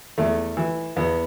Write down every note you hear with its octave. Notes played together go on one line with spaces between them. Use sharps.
E2 A3
E3
E2 B3